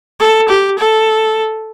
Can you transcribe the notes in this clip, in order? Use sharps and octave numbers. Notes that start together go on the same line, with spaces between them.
A4
G4
A4